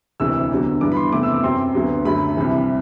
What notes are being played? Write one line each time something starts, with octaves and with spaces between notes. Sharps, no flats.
E1 D2 C3 E3 E6
E2 D3 F#3
G2 E3 B3 D4 D6
B5
C6
E2 C3 E3 A3 D6
E6
D6
F#2 F#3 C4 C6
D2 D3 F#3 B3
F#2 D3 F#3 A3 B5
C2 C3 E3